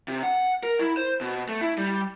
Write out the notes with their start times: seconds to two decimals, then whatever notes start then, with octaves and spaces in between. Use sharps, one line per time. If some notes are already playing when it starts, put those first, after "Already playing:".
0.08 C3
0.23 F#5
0.63 A#4
0.79 E4
0.97 C5
1.21 B2
1.49 A3
1.61 E4
1.78 G3